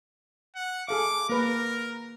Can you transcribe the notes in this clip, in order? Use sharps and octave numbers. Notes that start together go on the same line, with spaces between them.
F#5
G#4 A4 F5 D6
A#3 A#4 B4